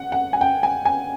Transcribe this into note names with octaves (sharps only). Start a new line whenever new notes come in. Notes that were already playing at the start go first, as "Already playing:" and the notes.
Already playing: F#5
F#5
G#5
G5
G#5
G#5